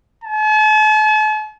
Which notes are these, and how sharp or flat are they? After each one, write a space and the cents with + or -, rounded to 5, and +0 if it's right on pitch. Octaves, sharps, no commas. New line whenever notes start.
A5 -45